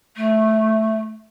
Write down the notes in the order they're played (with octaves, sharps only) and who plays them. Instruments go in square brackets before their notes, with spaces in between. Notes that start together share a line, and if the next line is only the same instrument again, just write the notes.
[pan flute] A3